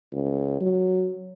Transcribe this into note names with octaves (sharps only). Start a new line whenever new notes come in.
C#2
F#3